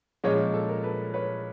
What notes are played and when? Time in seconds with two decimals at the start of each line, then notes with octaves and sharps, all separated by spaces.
0.24 A#2 F3 G#3 C#4 C#5 D#5
0.54 A4
0.69 A#4
0.83 A4 B4
1.14 B4 C#5